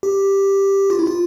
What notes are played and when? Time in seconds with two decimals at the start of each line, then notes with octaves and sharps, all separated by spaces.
0.03 G4
0.90 F4
0.99 E4
1.07 F4